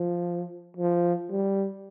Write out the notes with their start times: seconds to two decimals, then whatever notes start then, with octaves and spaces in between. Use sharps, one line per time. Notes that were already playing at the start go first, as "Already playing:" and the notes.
Already playing: F3
0.77 F3
1.30 G3